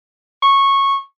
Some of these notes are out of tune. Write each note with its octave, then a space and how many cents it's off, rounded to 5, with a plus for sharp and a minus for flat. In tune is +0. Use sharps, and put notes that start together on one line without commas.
C#6 -15